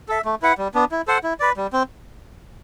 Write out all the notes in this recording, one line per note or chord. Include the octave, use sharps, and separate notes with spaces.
A4 E5
A3
E4 B4 F#5
G3
B3 D4
E4
A4 C5 F#5
E4
B4 D5
G3
C4